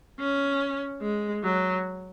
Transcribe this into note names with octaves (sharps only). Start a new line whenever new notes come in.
C#4
G#3
F#3